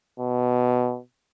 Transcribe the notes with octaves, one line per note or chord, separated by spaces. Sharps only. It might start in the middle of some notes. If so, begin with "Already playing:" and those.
B2